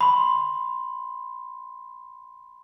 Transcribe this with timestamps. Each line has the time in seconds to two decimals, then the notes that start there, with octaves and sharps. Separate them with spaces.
0.01 B5 C6